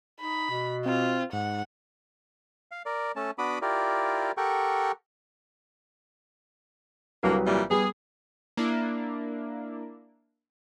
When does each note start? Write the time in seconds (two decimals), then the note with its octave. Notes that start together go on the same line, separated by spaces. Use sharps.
0.20 D#4 B5
0.50 B2
0.86 C4 F4
1.33 G#2 F#5
2.71 F5
2.86 A#4 D5
3.16 A3 C#4 A5
3.38 B3 D4 F#4 B5 D6 D#6
3.62 E4 F4 G4 A#4 D5
4.37 G4 A4 A#4 F#5 G5 C#6
7.23 C2 D3 F#3 A#3 B4
7.45 A#2 E3 G3
7.70 G3 B3 G#4
8.57 A#3 D4 E4